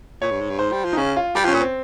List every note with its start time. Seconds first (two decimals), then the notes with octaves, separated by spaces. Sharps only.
0.21 A#2 C#5
0.31 G2
0.41 G#2
0.50 G2
0.59 G#2 C5
0.72 G3
0.85 F3
0.93 D#4
0.97 C#3 C#4
1.17 F4
1.35 G3 G4
1.45 F3 C#4
1.54 A#2
1.60 C4